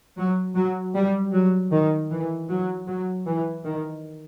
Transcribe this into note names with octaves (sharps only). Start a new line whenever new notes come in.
F#3
F#3
G3
F#3
D#3
E3
F#3
F#3
E3
D#3